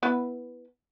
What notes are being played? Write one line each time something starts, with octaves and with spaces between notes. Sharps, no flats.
B3 E4 B4